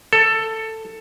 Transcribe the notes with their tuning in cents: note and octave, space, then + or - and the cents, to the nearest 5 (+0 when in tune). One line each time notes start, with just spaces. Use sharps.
A4 +10